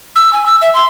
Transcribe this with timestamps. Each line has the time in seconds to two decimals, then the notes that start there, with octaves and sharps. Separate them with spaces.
0.16 E6
0.33 G#5
0.46 E6
0.62 E5
0.74 C6